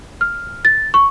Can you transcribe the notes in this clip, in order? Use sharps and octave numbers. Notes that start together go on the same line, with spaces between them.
F6
A6
C#6